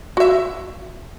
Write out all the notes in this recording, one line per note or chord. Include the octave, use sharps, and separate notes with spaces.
F#4 E5